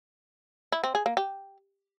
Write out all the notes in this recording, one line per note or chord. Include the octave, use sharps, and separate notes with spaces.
E4
C4
G#4
A#3
G4